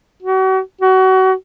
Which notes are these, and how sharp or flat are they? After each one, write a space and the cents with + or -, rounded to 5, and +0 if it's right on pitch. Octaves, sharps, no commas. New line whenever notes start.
F#4 +40
F#4 +30